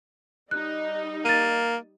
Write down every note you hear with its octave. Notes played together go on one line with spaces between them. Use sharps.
G3 D#4 F#6
A#3 A6 D#7